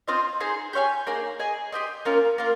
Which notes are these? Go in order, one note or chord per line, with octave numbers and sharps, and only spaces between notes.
C4 F4 C5 D#5
D#4 G#4 C5
G4 C#5 F5 G#5
A#3 D#4 G#4 C5
G#4 D#5 G#5
G4 C5 D#5
A#3 C#4 F4 A#4
A#3 F4 A#4